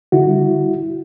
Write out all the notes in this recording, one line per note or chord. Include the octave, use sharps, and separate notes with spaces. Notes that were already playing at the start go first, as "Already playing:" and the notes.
D3 E4 F#4
G3